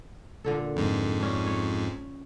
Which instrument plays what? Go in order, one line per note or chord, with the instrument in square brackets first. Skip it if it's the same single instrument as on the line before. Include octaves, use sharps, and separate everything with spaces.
[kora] A#2 D3 A4
[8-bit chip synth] F2 G#2
[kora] C#4 D4
C#5